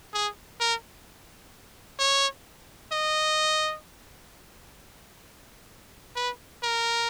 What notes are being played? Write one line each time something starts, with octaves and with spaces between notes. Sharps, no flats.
G#4
A#4
C#5
D#5
B4
A#4